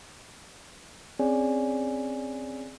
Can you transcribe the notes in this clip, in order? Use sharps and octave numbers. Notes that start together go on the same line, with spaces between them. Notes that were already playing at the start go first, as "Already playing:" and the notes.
C4 C#4 G#4 C#5 D5 G#5